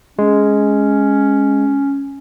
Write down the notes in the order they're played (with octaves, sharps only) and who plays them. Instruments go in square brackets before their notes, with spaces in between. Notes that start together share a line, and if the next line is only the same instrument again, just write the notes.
[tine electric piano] G#3 [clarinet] C#4